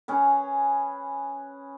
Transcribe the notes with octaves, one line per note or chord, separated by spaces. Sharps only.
C#4 G#4 B4